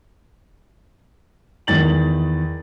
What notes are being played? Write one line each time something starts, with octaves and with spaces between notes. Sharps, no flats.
E2 D#3 A6 F#7